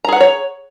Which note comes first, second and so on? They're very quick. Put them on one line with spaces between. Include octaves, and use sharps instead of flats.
A#5 G#4 F#5 B4 C#5